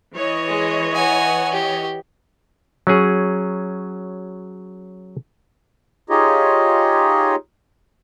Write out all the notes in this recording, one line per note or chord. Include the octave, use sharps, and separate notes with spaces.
E3 C#5 D#5
G#3
F#5 G#5
G4
F#3 C#4 G#4
D#4 F4 G4 G#4 C#5 D#5